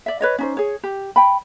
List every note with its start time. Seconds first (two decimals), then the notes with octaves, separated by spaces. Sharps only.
0.06 D5 E5
0.20 B4 C#5 D#5
0.38 C#4 D#4 C5
0.57 G#4 C#5
0.83 G4
1.16 G5 B5